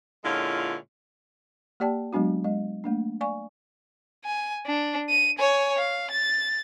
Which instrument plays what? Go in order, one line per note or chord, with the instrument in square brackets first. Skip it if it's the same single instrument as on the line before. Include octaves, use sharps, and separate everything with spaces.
[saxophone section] A#2 D3 G#3 C#4 E4 F4
[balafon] A#3 G4 D5 G5 A5
F#3 G#3 B3 D4 F#4
G#3 D#5
A3 A#3 D4
D5 F5 G#5 C#6
[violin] G#5
D4
D#7
C#5 G#5
F5
A6